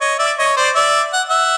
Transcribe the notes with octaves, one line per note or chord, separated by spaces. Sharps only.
C#5 D#5
D5 E5
C#5 D#5
C5 D5
D5 E5
F#5
E5 F#5